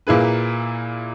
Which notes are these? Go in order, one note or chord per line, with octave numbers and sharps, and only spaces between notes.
A#2 A#3 E4 G#4 B4